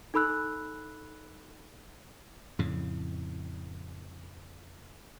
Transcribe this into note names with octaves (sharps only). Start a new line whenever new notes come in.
D#4 A4 B5 E6 F#6
F2 A2 C#3